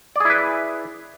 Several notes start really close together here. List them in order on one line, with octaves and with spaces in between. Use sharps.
D5 G#4 E4 B4